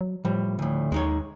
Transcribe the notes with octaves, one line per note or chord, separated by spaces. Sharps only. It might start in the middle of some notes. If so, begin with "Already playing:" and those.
F#3
A2 F3 G3
D2 A2
D#2 G#3 D#4 C#5